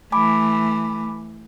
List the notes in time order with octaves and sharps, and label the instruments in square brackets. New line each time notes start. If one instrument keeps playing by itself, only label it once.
[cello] E3 A3 [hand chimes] G#5 B5 D6